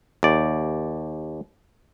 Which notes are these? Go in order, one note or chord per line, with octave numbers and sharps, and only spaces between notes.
D#2 D5